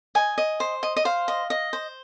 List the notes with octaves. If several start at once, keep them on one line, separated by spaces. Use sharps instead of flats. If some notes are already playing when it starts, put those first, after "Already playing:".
D#5 G#5
D#5
C5
D#5
D#5
C5 F5
D#5
D#5
C5